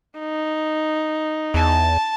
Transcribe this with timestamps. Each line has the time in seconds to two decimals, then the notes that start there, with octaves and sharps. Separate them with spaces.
0.19 D#4
1.54 E2 A5